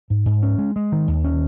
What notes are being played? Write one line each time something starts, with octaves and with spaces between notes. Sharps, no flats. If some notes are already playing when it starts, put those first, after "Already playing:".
G#2
G#2
C#4
G#3
G#3
D#3
D#2
C#4